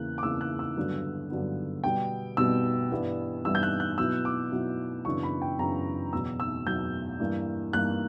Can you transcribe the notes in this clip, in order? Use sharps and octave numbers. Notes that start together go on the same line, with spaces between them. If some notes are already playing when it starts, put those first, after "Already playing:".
Already playing: E2 C#3 E3 A#3 F#6
D6
E2 C#3 E3 A#3 E6
F#6
E6
G2 D3 F#3 B3
G2 D3 F#3 B3
B2 G3 B3 G5
B2 G3 B3 E6
G2 E3 G3 B3 E4
G2 E3 G3 B3 E4 E6
G6
F#6
F#6
B2 F#3 B3 E4 E6
D6
B2 F#3 B3 E4
F#2 C#3 E3 B3 D4 C#6
B5
G5
F#2 C#3 E3 B3 D4 A#5
E2 B2 F#3 E6
E6
E2 B2 F#3 G6
G2 E3 A#3
G2 E3 A#3 F#6